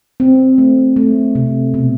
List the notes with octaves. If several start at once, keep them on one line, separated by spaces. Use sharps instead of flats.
C4
A3
A3
C3
B2